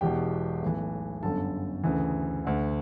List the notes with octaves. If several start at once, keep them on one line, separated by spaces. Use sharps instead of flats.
E1 E2 B2 G4 G5
B1 A2 E3
G1 F#2 D3 A4 A5
D2 C#3 E3
D2 D3